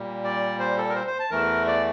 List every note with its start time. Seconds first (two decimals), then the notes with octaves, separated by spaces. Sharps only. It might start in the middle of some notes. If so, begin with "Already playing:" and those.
Already playing: A#2 G3
0.24 D5
0.59 C5
0.77 A4
0.89 A#4
0.95 C5
1.07 C5
1.19 A5
1.31 E2 E3 A3 A#4
1.67 D5